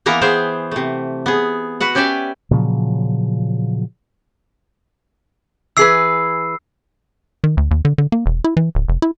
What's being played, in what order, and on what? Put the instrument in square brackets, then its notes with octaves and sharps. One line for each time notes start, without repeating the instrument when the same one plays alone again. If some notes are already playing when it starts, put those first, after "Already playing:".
[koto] E3 A#3 B3 A#4 A#5
B3 G#4 C5 G5
C3 A3
B3 G#4
F#4 B4 F#5
C#4 G4 D5 E5 G5 G#5
[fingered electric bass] A#2 C#3 F3 F#3
[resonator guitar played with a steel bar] E3 G#4 B4 [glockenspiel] E6 C7
[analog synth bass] D#3
D2
D#2
D3
D3
A#3
E1
E4
E3
D1
F1
E4